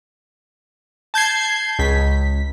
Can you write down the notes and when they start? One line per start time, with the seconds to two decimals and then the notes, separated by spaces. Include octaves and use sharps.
1.14 A5 G6 G#6 C7
1.79 C#2 B6